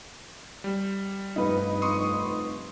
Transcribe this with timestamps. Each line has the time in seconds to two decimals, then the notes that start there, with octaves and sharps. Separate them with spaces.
0.64 G3
1.36 F1 G2 D#4 B4
1.82 F1 C6 C#6 D#6